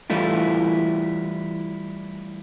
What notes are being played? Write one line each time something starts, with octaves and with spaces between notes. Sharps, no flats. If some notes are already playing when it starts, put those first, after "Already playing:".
E3 G3 A3 E4 F4